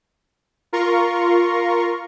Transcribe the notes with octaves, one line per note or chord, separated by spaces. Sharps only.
F4 A#4 A#5 C6 C#6